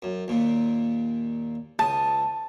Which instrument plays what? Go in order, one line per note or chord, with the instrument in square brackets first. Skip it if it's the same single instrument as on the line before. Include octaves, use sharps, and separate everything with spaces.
[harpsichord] F#2
D#2 A#2
[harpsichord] C#2 D#6 [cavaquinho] A5